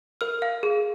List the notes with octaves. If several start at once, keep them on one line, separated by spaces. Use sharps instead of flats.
A#4 F6
F5
G#4